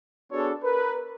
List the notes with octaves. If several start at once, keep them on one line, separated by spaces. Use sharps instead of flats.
B3 D4 F#4 G#4 A4 C#5
A#4 B4